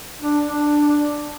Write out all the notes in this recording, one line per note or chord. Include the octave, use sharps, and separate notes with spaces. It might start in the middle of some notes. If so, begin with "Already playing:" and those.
D4
D4